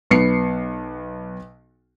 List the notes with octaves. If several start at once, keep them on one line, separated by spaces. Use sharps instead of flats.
B1 B3 C7 C#7